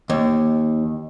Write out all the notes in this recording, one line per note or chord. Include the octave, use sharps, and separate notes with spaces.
D#2